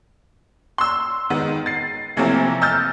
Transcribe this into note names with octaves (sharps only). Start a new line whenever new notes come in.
C6 E6
D#3 G#3 B3
A6 C7
C3 E3 F3 A3 A#3 C4
D#5 E6 F6 G6 A6